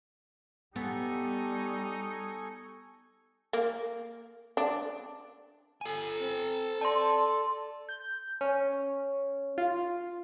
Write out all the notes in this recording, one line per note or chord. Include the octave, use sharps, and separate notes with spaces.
G3 B3 D#4 A4 G#5 C#6
A#3
D4
A4 G#5
C4
D5 A5 C6
G6
C#4
F4